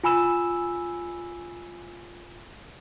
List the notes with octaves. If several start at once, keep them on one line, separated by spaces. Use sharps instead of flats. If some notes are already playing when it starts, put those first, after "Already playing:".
F4 G#5 B5 E6 E7